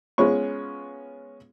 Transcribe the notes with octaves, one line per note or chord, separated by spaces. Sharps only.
G#3 B3 C#4 F4 C#6